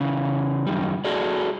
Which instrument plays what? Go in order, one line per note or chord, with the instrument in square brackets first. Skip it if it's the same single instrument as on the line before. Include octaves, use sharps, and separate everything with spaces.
[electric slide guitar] C#3 E3
F#2 D#3 G3
F#4 G#4 A4 D5